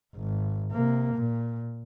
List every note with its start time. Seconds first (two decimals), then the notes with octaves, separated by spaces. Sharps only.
0.16 G#1
0.71 C3 A#3
1.15 A#2